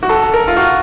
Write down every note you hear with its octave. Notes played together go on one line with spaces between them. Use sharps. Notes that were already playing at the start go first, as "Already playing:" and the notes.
F#4
A4
A#4
F4
F#4